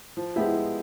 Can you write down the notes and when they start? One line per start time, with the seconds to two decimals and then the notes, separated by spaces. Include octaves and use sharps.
0.17 F3
0.36 G#3 B3 E4 G4
0.55 F3